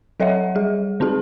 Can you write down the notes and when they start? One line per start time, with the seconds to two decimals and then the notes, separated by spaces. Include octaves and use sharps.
0.20 F#3 A4 C#5 D#5 E5 F#5
0.55 G3 G#4
1.00 D3 C4 D#4 G#4 A5